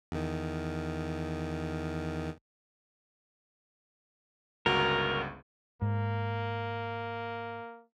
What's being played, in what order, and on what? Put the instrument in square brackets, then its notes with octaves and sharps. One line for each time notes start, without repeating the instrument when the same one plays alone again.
[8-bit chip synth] E2 D#3
[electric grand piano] G1 C#2 F#4 [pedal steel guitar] A#4
[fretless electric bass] G#2 [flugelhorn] A#3